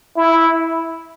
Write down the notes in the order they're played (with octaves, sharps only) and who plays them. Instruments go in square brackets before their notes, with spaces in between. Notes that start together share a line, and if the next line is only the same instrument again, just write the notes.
[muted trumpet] E4